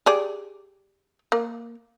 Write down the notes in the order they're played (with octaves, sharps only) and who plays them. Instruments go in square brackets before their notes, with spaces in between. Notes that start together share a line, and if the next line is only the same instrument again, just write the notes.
[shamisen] G4 G#4 D5
A#3